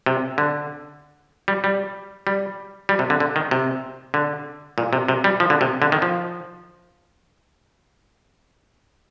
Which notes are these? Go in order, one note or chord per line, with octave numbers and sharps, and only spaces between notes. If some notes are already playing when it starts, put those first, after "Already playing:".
C3
D3
G3
G3
G3
G3
C3
D3
D3
D#3
C3
D3
A#2
C3
C3
G3
F3
D3
C3
D3
D#3
F3